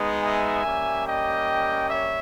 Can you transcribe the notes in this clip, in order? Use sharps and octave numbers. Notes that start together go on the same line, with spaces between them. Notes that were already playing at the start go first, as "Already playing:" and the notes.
Already playing: G#3 B3 D#4
E5 G#5
G3 A#3 C#4 G4
D#5 G5
C#5 E5